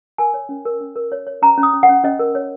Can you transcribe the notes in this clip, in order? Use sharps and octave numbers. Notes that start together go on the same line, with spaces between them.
A#4 G#5
C#5
C#4
A#4
C#4
A#4
C#5
C#5
C#4 A#5
C#4
D#6
C#4
F#5
C#4
C#4 D#5
A#4
C#5